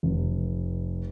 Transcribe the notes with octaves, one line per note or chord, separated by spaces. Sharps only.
F1